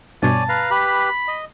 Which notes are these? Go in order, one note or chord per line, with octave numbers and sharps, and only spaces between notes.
G2 B2 C#5 D5 G#5 A5
B4 F5 A#5
G4 B4 B5
D#5